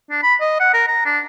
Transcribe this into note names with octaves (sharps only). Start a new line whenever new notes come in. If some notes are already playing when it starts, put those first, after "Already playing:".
D4
B5
D#5
F#5
A#4
A#5
D4